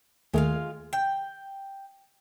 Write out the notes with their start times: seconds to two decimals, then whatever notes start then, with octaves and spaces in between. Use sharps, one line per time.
0.34 D#2 D#3 G#3 A3 F4 F5
0.93 G5